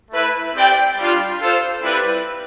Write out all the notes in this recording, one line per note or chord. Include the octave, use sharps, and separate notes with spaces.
A3 E4 B4
C4 G4 D5 G5
G3 D4 F4
F4 A4 C5
G3 C4 E4 B4